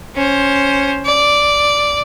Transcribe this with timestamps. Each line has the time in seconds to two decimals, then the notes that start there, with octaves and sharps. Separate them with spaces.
0.15 C#4 C5
1.06 D5